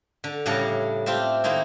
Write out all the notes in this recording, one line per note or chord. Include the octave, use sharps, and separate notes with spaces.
D3
A2 C#3 G3 D4 A#4 F#5
A3 C4 F4 G4 E5
D#3 A#3 C4 D#4 E4